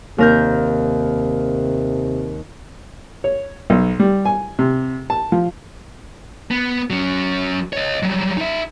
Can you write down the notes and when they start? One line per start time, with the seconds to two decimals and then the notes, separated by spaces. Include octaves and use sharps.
0.18 D#2 C3 A#4 G6
3.24 C#5
3.70 B1
4.00 G3
4.25 G#5
4.59 C3
5.10 A5
5.32 F3
6.51 B3
6.90 F#3 C#4
7.73 C#5 D#5
8.03 F#3 G3
8.37 D#4 E5